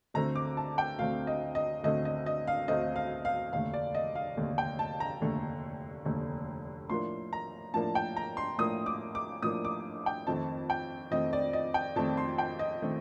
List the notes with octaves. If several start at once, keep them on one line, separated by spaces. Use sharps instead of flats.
D2 D3 A3 C4 A#5
D6
A5
G5
D2 D3 A3 C4 F5
D#5
D#5
D2 D3 A3 C4 D#5
D#5
D#5
F5
D2 D3 A3 C4 D#5
F5
F5
F1 D#2 D3 A3 F5
D5
D#5
F5
F1 D#2 D3 A3
G5
A5
A#5
F1 D#2 D3 A3
F1 D#2 D3 A3
A2 F3 A#3 D4 C6
A#5
A2 F3 A#3 D4 A5
G5
A#5
C6
A2 F3 A#3 D4 D#6
D6
D6
A2 F3 A#3 D4 D#6
D6
G5
F2 D#3 A3 C4 A5
G5
F2 D#3 A3 C4 D#5
D5
D#5
G5
F2 D#3 A3 C4 A5
C6
G5
D#5
D#3 A3 C4